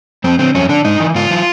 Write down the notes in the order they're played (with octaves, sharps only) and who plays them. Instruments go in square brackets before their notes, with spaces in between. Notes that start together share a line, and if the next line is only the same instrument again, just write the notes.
[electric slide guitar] F2 C4
D3 C4
F2 C#4
D3 D4
G#2 D#4
E3
G#2 F4
E3